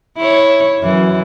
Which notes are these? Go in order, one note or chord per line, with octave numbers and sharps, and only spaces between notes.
E4 C#5
F#2 E3